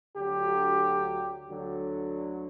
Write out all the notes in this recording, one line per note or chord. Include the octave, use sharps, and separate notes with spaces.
D2 D3 F#3 G4
D2 D3 F#3